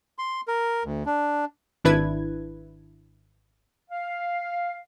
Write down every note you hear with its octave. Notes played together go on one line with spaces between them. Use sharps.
C6
A#4
D2
D4
G#1 D4 E4 B4 G#6
F5